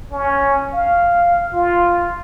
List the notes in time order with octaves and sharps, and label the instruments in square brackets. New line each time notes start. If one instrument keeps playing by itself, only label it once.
[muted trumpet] C#4
F5
F4